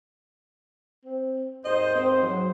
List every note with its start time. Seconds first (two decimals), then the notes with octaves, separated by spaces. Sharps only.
1.05 C4
1.65 D#2 G#2 C5 D#5
1.95 C4
2.23 F#3